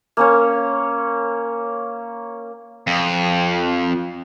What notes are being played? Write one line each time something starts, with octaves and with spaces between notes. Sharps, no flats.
A#3 C#4 C#5
F2